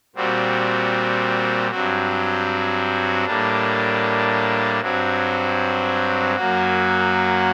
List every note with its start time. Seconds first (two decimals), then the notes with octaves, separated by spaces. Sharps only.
0.16 A#2 G3 C4 F#4
1.71 G2 F#3 C4 F#4
3.25 A2 G3 A#3 D4
4.81 G2 F#3 C4 F#4
6.35 F#2 F#3 A#3 F#4